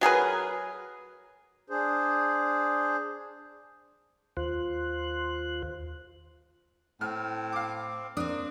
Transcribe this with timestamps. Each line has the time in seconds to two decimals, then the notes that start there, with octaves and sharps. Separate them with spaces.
0.01 F#3 G#4 A#4 B4
1.70 D4 G#4 C5
4.37 D#2 F4 C5 F#6
7.01 A2 C4 F6
7.53 F5 D6
8.17 A#3 C4 D4 D#6